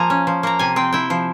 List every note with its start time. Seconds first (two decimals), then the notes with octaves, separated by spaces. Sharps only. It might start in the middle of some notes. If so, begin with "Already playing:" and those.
Already playing: F3 A#3 G#5 A#5
0.10 C#4
0.27 F3
0.43 A#3 A#5
0.59 C3 G#5
0.76 C4 G5
0.93 E4 G5
1.10 F3